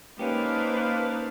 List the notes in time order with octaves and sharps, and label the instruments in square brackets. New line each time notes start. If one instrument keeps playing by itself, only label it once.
[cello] A#3 D#4 [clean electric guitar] C#4 G4 [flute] B4 [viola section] C5 F5 A5